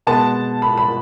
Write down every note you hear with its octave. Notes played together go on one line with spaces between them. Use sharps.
B2 G#3 B3 A5
B5
B5